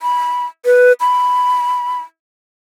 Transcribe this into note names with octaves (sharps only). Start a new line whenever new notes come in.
B5
B4
B5